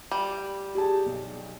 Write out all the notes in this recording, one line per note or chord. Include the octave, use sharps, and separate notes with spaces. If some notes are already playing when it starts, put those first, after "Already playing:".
G3
G4 G#4 A5
B1